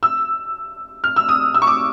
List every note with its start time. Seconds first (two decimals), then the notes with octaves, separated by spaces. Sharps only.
0.03 E6
1.04 F6
1.16 E6
1.29 D#6
1.54 E6
1.62 C#6
1.67 D6